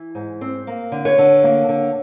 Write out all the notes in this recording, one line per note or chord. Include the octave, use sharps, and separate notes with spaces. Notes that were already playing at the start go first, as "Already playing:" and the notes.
Already playing: E3
G#2
C4
A#3
D3
B4 C#5
D3
A#3
D3